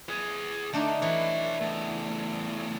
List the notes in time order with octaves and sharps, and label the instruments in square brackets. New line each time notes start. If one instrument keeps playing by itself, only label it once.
[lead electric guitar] G#4 B4
[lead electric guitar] D3 [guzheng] A3 D4 D#4
[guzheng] E3 [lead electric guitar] B4 C#5
[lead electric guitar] E2 A3